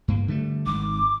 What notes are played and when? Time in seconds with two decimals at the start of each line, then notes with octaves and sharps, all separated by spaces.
0.08 G2 A#3
0.28 D3 G3 A3
0.66 G#1 D6